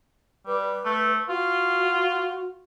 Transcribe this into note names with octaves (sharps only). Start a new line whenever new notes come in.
G3 B4
A3
F4 F#4